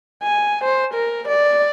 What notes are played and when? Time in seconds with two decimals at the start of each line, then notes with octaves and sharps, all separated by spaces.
0.23 G#5
0.64 C5
0.94 A#4
1.28 D5